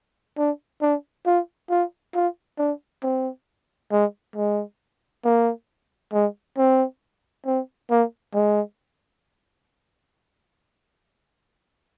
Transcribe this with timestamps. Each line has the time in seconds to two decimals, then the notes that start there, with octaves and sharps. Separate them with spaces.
0.37 D4
0.81 D4
1.26 F4
1.70 F4
2.14 F4
2.58 D4
3.03 C4
3.92 G#3
4.36 G#3
5.25 A#3
6.13 G#3
6.58 C4
7.46 C4
7.90 A#3
8.34 G#3